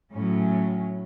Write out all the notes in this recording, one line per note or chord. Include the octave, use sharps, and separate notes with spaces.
A2 F#3 C#4